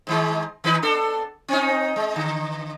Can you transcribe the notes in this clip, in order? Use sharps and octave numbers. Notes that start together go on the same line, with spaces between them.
G#2 D#3 G#3
D#3 D#4 B4
B3 D4 A4
C4 C#4 D#4
G#3
D3